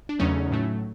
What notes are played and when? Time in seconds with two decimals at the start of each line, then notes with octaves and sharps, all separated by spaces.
0.09 D4
0.19 E2 C#3 F#3 A3 C#4 D#4
0.51 A2 F#3 A3